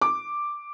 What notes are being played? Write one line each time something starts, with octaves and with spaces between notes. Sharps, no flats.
D6